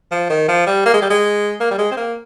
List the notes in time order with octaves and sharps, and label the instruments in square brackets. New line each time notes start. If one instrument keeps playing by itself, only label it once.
[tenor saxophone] F3
D#3
F3
G3
A#3
G#3
G3
G#3
A#3
G3
G#3
C4
A#3